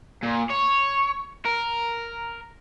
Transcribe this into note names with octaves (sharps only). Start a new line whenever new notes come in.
A#2
C#5
A#4